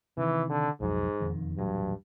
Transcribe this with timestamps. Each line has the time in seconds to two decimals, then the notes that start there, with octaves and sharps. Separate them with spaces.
0.17 C3 D#3 E3
0.50 D3
0.80 B1 F2 G#2 F#3
1.20 E1 F2 D#3
1.57 D#1 A1 G2 F#3